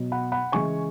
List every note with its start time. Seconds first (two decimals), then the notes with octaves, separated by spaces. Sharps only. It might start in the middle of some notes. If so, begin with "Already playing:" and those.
Already playing: B2 F#3
0.12 F#5 B5
0.32 F#5 B5
0.52 C#3 E3 G#3 G#5 C#6